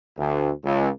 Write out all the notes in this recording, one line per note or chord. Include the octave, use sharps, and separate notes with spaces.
D2
C#2